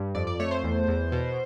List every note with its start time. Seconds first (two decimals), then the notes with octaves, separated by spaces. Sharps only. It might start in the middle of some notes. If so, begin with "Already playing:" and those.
Already playing: G2
0.15 F2 D5
0.27 D5
0.40 A3 C#5
0.51 C5
0.64 E2
0.88 E2
1.12 B2